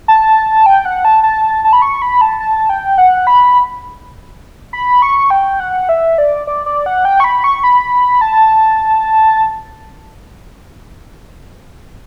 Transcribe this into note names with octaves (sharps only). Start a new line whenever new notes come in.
A5
G5
F#5
A5
A5
A5
B5
C#6
B5
A5
A5
G5
F#5
B5
B5
C#6
G5
F#5
E5
D5
D5
D5
F#5
G5
C#6
B5
C#6
B5
A5